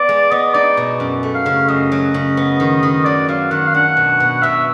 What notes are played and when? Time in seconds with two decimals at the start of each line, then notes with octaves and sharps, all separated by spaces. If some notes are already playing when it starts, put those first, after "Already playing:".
Already playing: B3 D5
0.09 G#3
0.31 B3 D#5
0.54 D#4 D5
0.77 B2
1.00 F#2
1.23 A3
1.35 F5
1.46 C#3
1.69 F#2 D#5
1.92 F#3
2.14 C#3
2.37 B3
2.60 D#3
2.83 D#3
3.05 F#3 D5
3.29 F#3 F5
3.51 D#3 F#5
3.67 F5
3.74 D4 F#5
3.97 B2
4.20 B2
4.42 B2 E5